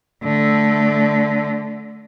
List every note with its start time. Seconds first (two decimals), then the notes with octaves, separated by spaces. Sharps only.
0.24 D3 A3